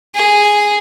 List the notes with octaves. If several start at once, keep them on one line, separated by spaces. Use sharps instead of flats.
G#4